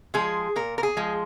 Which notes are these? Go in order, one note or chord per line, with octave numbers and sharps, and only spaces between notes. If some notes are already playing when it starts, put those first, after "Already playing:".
F3 G#3 G#4
A#2 A#4
A#4
G#4
F3 G#3